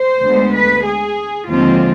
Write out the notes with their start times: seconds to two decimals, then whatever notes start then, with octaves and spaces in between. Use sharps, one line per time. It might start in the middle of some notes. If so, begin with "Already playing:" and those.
Already playing: C5
0.23 D2 D3 G#3 B3
0.54 B4
0.86 G#4
1.48 D#2 D3 F3 G#3 C4 F4